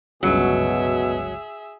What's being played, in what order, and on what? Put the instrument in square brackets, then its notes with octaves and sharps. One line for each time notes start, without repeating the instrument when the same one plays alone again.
[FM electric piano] G1 C#2 [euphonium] B2 [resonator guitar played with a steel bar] F#3 [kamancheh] G#4 E5